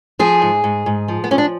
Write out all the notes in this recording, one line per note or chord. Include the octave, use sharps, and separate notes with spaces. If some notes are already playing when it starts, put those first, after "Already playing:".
F3 G#4
G#2
G#2
G#2
F3
B3
F3 C#4
D4